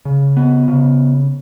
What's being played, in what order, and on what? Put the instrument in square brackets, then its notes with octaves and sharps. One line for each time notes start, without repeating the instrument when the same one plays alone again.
[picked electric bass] C#3
B3
C#3